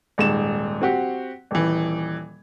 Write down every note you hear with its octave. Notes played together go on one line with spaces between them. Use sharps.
D#1 G#2 E7
C4 F#4 G4
D#1 E3